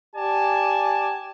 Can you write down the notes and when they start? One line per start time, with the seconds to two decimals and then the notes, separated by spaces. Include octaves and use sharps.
0.15 G4 D5 G#5 A5